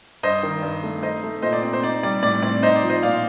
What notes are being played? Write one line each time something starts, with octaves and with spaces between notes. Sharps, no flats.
G2 C5 D#5
D#3
G2
A3
D#4 C5 D#5
A3
A#2 C5 D#5
D5
C4 D5
C5
D#4 D5
G3 D5
A2 D5
C4 D5
D#4 C5 D#5
D5
F3
C5 D#5
A#2 D5 F5